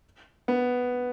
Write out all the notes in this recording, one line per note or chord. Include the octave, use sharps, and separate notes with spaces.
B3